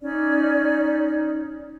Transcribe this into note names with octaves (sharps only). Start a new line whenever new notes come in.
C#4 D#4 D5